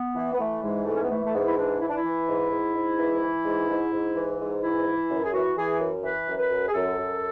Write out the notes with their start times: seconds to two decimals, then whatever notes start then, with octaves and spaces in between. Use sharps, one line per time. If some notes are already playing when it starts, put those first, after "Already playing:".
Already playing: B3
0.15 E3
0.33 B3
0.39 E3 A3
0.62 G#2 G#3
0.86 E3 A3
0.95 C#4
1.02 B3
1.09 E3 A3
1.24 A3
1.33 G#2 B3
1.47 E4
1.57 E3 D4
1.80 E3 E4
1.88 D4
1.97 E4
2.04 E3
2.27 G#2
2.50 G#2
2.74 G#2
2.98 E3
3.21 E3
3.45 G#2
3.68 G#2
3.92 G#2
4.15 E3
4.39 G#2
4.62 E3 E4
4.86 E3
5.09 F#2
5.24 G#4
5.32 E3 F#4
5.56 E3 G#4
5.79 F#2
6.03 E3 B4
6.26 F#2
6.38 B4
6.50 F#2
6.68 G#4
6.74 F#2 A4
6.97 F#2